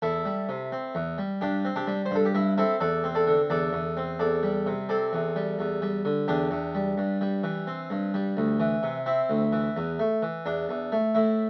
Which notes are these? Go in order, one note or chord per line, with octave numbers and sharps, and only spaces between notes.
E2 E4 A4
G3
C3
C4
E2
G3
G2 D4 G4
C4
D4 G4
G3
C5
G2 A4
G4
G2 E4
C4 E4 A4
E2 A4 D5
C4
A4 D5
D3
E2 A4 D5
E2
C4
E2 A4 D5
G3
C3
C4 A4 D5
E2
G3
E2
G3
D3
E2 D4 G4
E2
G3
G2
G3
E3
C4
G2
G3
D2
E3
C3
C4 E4
D2
E3
E2
A3
E3
E2 D4
E2
A3
A2 E4